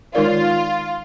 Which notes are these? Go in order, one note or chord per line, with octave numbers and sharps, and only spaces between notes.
D#3 G#3 D#4 F4 A#4 D5